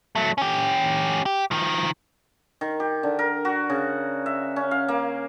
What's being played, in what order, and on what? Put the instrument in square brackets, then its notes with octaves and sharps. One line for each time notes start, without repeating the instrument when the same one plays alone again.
[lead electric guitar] F#3 A3
C#4 G4
G4
D#3 F3
[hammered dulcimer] D#3
G4
D3
A#4
F#4
C#3
E5
C#4
F5
A#3